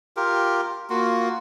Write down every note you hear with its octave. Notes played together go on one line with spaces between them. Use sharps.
F4 G4 A#4
A#3 F4 F#4